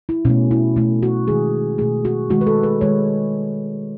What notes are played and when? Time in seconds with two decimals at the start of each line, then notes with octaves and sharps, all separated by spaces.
0.09 E4
0.25 B2 A3 C#4
0.51 E4
0.76 B2 A3 E4
1.03 F#4
1.27 D#3 G#3 G#4
1.78 B2 A3 G#4
2.05 F#4
2.30 D#3 G#3 F#4
2.41 B4
2.47 A4
2.63 B4
2.81 D#3 G#3 C#5